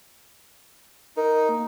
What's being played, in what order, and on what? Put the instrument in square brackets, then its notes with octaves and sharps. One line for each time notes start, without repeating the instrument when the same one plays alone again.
[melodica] D#4 [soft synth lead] A#4
[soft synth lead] A#3